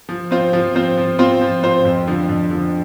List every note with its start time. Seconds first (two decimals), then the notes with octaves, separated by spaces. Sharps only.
0.09 F3
0.31 C4 F4 C5
0.53 F3
0.75 C4 F4 C5
0.97 F3
1.19 C4 F4 C5
1.41 F3
1.63 C4 F4 C5
1.85 F2
2.07 D3 F3
2.29 F2
2.51 D3 F3